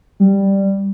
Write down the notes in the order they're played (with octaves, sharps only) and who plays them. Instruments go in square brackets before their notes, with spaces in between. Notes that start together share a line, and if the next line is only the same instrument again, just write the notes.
[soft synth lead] G3